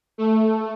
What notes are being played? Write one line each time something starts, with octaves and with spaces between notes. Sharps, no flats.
A3